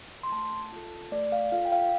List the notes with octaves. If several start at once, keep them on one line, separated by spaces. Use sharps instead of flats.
C6
A3 A5
F4 A4
A3 D5
F5
F4 A4 F5
G5
F5